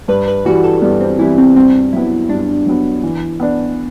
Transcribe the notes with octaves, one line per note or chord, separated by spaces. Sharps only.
G2 B4
B4
E3 G3 F#4
A4
G2 B3
C4
E3 G3 E4
C4
G2 C4
F#3 B3 E4
G2 D4
F#3 B3
E3
B3 D4